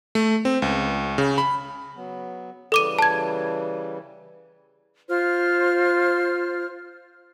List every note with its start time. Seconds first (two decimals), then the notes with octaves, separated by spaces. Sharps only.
0.15 A3
0.45 C4
0.62 C#2
1.18 C#3
1.38 B5
1.96 F#3 B3
2.72 C#3 E3 G3 A4 D6 D#7
2.99 A5 G#6
5.08 F4 C5 F6